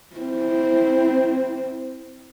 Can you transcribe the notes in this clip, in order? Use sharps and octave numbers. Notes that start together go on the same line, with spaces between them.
C4 E4